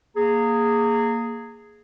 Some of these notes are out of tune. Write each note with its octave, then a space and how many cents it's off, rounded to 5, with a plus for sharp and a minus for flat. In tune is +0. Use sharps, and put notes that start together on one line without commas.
A#3 +0 G#4 +0 A#5 -30